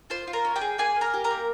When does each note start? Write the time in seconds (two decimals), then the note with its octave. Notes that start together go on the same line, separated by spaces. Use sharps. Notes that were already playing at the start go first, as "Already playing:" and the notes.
0.10 F4 C5 C6
0.27 F4
0.33 A#4 A#5
0.45 C#4
0.56 G4 G5
0.61 G#4
0.78 A#3 G#4 G#5
0.96 A#3
1.01 A#4 A#5
1.14 G4
1.24 A#4 A#5
1.30 A#3